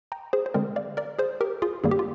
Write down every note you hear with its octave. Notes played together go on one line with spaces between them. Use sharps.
G5 A#5
G#4 C5
C5
D3 G#3 C4 A#4 D5
D5 F5
A#4 D5
G#4 C5
G4 A#4
F4 G#4
G2 D#3 G3 A#3 G#4
G4
F4